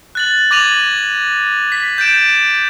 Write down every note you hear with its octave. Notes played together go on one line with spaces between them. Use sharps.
F#6 A6 F#7
D6 G#6 A#6 D#7 F7 F#7
B6
G6 A6 D7 E7